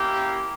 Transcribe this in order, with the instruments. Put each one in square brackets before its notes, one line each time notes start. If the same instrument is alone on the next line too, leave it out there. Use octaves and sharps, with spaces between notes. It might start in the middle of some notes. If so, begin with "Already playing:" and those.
Already playing: [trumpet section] A#3 C#4 E4 G4